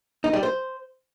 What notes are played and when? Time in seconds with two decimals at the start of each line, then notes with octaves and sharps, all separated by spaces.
0.24 D#4
0.33 G3
0.43 C5